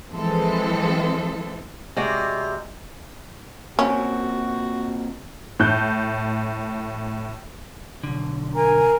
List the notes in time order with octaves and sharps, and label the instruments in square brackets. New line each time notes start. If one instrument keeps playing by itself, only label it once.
[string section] E3 F3 G#3 C4 A4
[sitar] C3 [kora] G#3 F#4 D5
[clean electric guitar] A#2 C4 [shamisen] C#4 [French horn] F#4
[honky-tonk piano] A2 F#6 G6
[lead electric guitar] B1 D3
[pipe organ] A#4 [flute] G#5